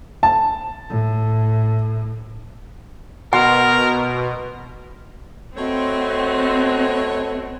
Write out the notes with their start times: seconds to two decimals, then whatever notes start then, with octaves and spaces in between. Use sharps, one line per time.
0.23 A5
0.89 A2
3.33 B2 A#4 F#5 C6
5.57 A3 C4 F#4 B4 C#5 D#5 F#5